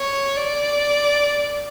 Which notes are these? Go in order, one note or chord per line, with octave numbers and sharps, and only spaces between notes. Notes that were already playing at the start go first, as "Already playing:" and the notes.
Already playing: C#5
D5